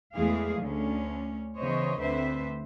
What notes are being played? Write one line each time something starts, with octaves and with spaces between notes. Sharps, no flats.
E2 E3 G#3 A3 G#4 F5
D2 D3 C#4
C#3 E3 B3 C5 C#5 D#5
D2 D3 C4 B4 C5 E5